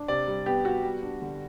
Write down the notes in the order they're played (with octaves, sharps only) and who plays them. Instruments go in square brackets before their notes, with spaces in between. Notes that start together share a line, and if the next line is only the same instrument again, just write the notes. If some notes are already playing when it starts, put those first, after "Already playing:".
Already playing: [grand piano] D4
C3 D5
G3
B3 G4
B3 F#4
G3
D4
D3